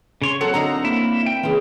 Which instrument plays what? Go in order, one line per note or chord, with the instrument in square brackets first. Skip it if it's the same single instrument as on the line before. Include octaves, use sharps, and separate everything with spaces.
[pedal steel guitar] C#3 C#5 C6
[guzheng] F#3 A#3 C4 [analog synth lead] A4 [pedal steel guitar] F#5
[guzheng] D3 D#4 F5 [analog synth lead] A#5
[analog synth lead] A#3 [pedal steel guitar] E4
[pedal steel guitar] G5
[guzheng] C#3 F4 [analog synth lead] E3